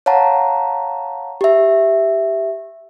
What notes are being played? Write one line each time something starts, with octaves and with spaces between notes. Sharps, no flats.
C#5 F5 F#5 A5 A#5
G4 E5